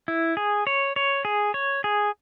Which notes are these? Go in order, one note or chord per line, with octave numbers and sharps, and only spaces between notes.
E4
G#4
C#5
C#5
G#4
C#5
G#4